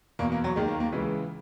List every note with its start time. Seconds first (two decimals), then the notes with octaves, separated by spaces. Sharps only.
0.19 E2 B2 A#3
0.32 A#3
0.44 F#3
0.56 D#2 D#3 G#3
0.68 A#3
0.80 A#3
0.92 C#2 C#3 E3 G#3